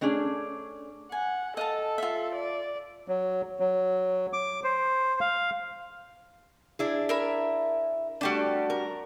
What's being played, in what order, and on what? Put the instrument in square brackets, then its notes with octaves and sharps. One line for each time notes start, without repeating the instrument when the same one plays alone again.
[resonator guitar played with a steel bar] A3 C#4 D4 G#4 D5
[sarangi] F#5 [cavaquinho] G#5
[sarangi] A4 [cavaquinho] D#5 F5 A5
[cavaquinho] F4 E5
[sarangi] D5
[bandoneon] F#3
F#3
D6
C5
F5
[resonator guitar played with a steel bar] D4 E4 G#4
[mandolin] A#4 E5 B5
[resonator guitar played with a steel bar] G3 A3 D4 [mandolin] F#4 G4 A5
[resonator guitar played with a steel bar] A#4